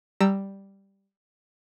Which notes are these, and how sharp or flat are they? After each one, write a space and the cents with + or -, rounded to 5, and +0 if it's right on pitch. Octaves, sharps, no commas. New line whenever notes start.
G3 +0 A#5 -20 E6 +0